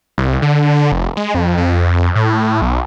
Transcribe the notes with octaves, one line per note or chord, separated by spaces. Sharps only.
C2
D3
F1
G#3
F2
F2
A2
B1